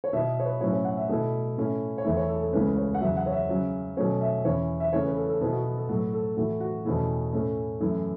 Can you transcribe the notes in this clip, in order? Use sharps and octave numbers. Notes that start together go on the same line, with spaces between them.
C#5
B2 B3 E4 E5
C#5
B4
A2 F#3 C#4 E4 C#5
C#5
F#5
E5
B2 A3 E4
A2 A3 C#4 E4
C#5
E2 E3 A3 E4 E5
C#5
A4
A4
C#2 C#3 E3 A3 C#4 B4
C#5
F#5
E2 C#3 F#3 E5
F#5
C#5
E5
C#3 F#3 C#4
B2 F#3 A3 C#4 C#5
E5
E2 E3 C#4 E4 C#5
E5
C#3 E3 A3 C#4 C#5
B4
A4
A4
B2 B3 E4 A4
F#4
F#4
A4
A2 F#3 A3 F#4
A4
A2 E3 A3 E4 F#4
F#4
E2 B2 A3 C#4 E4
A2 A3 C#4
F#2 E3 A3 E4